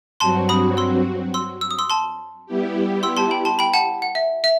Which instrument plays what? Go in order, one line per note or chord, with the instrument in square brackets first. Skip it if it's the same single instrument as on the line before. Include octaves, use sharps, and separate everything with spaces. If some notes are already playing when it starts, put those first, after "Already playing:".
[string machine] G2 F#3 C4 F#4 [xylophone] A5 C6
[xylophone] B5 D#6
C6 E6
C6 E6
E6
D#6
C6 E6
A5 C6
[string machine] G3 B3 E4 G4
[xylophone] C6 E6
A5 C6
G5 B5
A5 C6
G5 B5
F#5 A5
F#5
E5
E5